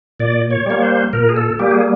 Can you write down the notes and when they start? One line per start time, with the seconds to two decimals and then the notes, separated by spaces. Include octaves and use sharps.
0.20 A#2 D5
0.50 C#5
0.66 G3 A#3 C#5
0.82 C5
1.13 A#2 A#4
1.29 G#4
1.37 A4
1.59 G3 A#3 G4
1.71 G#4